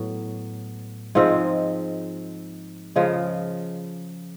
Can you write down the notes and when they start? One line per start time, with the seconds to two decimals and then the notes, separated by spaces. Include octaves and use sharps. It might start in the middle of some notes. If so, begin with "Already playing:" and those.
Already playing: A2 F#3 B3
1.15 G#2 F3 G#3 C4
2.96 C#3 F3 G#3